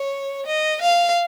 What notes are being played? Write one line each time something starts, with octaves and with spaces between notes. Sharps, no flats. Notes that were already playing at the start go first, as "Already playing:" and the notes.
Already playing: C#5
D#5
F5